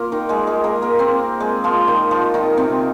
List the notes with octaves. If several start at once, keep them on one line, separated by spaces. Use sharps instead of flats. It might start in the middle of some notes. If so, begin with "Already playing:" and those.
Already playing: A#3 F4 A#4
D#3 D#4
G#3 G#4
G#3 G#4
A#3 A#4
A#3 A#4
C4 C5
G#3 G#4
F3 F4
D#3 D#4
F3 F4
D#3 D#4
C3 C4